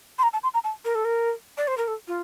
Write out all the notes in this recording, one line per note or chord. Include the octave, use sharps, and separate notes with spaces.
C6
A#5
A5
C6
A#5
A5
A#4
A4
A#4
D5
C5
A#4
A4
F4